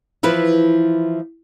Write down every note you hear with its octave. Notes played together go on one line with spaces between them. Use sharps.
E3 F3 E4 B4